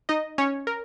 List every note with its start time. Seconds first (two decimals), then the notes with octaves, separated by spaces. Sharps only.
0.09 D#4 D#5
0.38 C#4 C#5
0.67 A#4